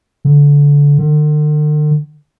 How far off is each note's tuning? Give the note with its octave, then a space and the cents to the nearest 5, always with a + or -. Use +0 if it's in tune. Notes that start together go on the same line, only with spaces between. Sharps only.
D3 -25
D3 +45